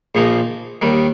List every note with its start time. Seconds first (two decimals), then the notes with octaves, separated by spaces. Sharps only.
0.15 A#1 A#2 F3 A#3 D#4
0.82 D#2 D#3 G3